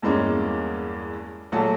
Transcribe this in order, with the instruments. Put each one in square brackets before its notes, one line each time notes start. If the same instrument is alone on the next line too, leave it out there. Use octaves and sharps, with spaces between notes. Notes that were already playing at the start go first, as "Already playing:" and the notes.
[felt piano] E2 G2 G#3 A#3 C#4
A#1 F#3 A3 A5